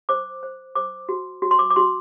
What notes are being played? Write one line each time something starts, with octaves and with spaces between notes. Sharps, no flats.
C5 D6
C5
C5 D6
F#4
F#4
C6
D6
D6
F#4 C6